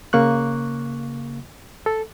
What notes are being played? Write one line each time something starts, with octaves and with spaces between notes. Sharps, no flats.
C#3 A#3 C#6 F#6
A4